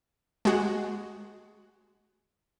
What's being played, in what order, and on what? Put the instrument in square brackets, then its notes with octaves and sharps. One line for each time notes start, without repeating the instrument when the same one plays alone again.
[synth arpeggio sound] G#3 F#4